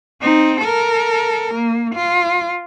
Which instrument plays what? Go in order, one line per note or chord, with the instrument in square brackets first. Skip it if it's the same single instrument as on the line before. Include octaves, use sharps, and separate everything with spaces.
[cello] C4 D#4
A4 A#4
A#3
F4